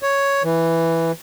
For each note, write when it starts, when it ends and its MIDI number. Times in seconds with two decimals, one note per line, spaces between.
0.03 0.43 73
0.44 1.12 52